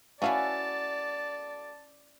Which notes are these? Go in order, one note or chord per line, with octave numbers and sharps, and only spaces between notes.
A3 C#4 E4 F#4 B4 D5 F5 A5